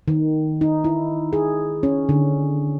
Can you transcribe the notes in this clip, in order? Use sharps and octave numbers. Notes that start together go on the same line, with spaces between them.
D#3
D#4
E4
G#4
C#4
D3